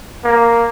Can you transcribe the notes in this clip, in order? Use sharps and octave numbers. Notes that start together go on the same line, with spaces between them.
A#3